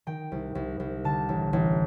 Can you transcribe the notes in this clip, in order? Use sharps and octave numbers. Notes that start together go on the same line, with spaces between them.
D#3 G5
C2
C2
C2
D3 A5
A1
A1